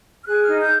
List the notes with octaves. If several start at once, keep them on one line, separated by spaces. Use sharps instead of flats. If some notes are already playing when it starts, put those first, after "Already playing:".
F6
G#4 F#6
D#4 F6
G6